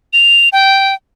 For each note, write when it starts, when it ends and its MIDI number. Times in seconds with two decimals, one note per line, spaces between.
0.13 0.49 101
0.53 0.95 79